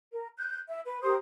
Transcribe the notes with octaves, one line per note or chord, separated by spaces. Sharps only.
A#4
F#6 G6
E5
B4
G4 A#4 C5 D#6